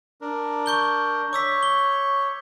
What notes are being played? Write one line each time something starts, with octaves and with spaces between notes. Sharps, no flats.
D4 A#4
C#6 G6 G7
C#5 D6 E6 B6
G7